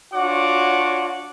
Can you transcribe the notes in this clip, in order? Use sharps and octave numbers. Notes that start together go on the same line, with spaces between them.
D4 F4 F#4 C#5 F#5 D6